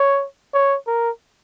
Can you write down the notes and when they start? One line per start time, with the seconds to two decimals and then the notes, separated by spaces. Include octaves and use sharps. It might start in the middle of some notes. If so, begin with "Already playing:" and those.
Already playing: C#5
0.54 C#5
0.87 A#4